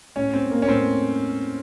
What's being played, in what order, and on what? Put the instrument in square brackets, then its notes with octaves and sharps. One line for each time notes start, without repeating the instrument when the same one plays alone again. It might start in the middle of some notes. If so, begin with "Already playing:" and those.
[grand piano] A2 C#4
C4
A#3
C#4
A2 C4